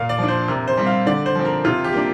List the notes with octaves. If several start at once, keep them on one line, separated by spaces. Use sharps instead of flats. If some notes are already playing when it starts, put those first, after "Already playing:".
Already playing: A#2 F5
D5
F3 D4
C5
C3 A#4
C5
G3 C4
F5
D3 D5
C5
F3 C4
A#4
C3 F4
G4
A#3 D4